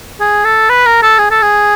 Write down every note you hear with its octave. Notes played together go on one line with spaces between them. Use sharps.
G#4
A4
B4
A#4
A4
G#4
A4
G#4